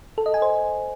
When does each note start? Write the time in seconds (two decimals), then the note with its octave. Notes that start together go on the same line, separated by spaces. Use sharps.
0.18 A4
0.26 D#5
0.34 G#5
0.42 C5